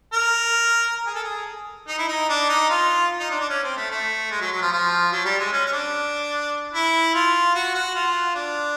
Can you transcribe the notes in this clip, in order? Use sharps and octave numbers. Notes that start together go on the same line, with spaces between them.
A#4
G#4
A4
G#4
D#4
E4
D#4
D4
D#4
F4
D#4
D4
D4
C#4
C4
A3
A3
G#3
F#3
F#3
F3
F3
F#3
G3
G#3
C#4
C#4
D4
E4
F4
F#4
F#4
F4
D4